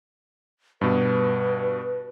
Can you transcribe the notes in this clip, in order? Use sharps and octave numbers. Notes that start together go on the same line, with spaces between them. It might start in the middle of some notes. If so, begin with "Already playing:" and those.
G2 B2 B4